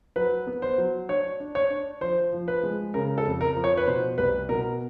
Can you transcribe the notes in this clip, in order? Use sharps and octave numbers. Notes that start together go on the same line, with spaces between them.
F#3 B4
B3
C5
F#3
D4 C#5
D4
C#5
D4
F3 C5
F3
B4
G#3
C#3 A#4
A4
F2
A#4
F3
C#5
B4
B2 C5
C2 B4
B2 A#4